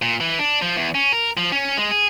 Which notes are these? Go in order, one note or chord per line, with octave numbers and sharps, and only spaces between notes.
A#2
E3
D4
F3
E2
C#4
A#4
F3
C#4
G#3
G#4